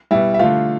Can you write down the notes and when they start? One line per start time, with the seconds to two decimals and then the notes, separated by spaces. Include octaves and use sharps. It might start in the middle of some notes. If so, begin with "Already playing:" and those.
0.11 B2 G3 E4 E5
0.34 E5
0.39 D3 A3 F4 F5